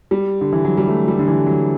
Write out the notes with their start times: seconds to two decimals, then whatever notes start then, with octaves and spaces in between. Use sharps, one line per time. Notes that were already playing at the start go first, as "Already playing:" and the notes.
0.11 G3
0.41 D3
0.52 E3
0.65 F#3
0.77 G3
0.88 A3
1.08 G3
1.19 D3
1.28 E3
1.46 F#3